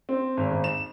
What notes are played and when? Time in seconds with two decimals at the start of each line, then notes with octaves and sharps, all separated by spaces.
0.09 C4
0.37 G#1
0.51 G#1
0.64 E7